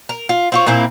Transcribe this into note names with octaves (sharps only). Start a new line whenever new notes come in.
A#4
F4
C4 F4 C#5
A#2 A#3 C4 E4